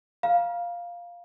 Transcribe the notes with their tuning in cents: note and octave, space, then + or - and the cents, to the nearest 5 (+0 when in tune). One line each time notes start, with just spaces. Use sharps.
F5 +0 A#5 +35